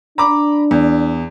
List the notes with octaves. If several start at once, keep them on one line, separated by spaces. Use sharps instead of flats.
D4 A#5 B5 D6
E2